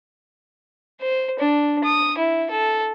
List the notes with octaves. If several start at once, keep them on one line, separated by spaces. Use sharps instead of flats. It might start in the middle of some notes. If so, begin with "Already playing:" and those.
C5
D4
D#6
E4
A4